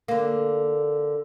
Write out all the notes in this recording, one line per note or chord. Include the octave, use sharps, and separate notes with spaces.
D3 A#3